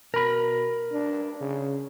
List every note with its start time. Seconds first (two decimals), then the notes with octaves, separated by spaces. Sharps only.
0.14 B2 A#4 B5
0.92 D4
1.41 C#3